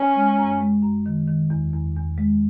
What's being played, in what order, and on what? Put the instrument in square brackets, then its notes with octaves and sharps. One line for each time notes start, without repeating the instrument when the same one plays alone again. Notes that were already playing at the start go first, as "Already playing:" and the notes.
Already playing: [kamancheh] C#4
[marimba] G#3
F#2
G#3
F#2
D#3
D#3
E2
E2
E2
G#3